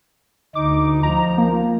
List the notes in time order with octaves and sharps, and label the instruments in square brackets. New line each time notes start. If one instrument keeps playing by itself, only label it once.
[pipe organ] D2 D#4 [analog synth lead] D6
[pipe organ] F3 [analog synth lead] A#5
[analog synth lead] A#3